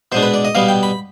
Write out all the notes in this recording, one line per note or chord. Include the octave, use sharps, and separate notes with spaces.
B2 G#3 D4 C5
B4
D5
D#5
B2 G3 B3 F5
G5
B5